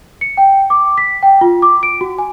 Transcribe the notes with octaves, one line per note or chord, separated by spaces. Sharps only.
C#7
G5
D6
B6
G5
F4
D6
D7
F#4
G#5